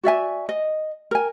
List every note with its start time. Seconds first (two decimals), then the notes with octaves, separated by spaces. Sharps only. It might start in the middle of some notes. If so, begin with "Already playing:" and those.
0.03 F#4 D5 E5 G#5
0.49 D#5
1.11 A#4 G#5